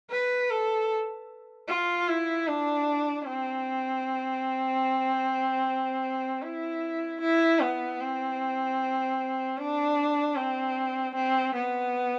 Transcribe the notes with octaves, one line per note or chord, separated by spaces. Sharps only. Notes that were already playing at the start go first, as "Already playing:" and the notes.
B4
A4
F4
E4
D4
C4
E4
E4
B3
C4
D4
C4
C4
B3